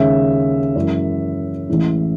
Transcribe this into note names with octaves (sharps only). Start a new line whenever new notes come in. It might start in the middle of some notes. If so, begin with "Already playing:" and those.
Already playing: D#2 C#3 G#3 E5
F#2 E3 G#3
A1 A2 E3 G#3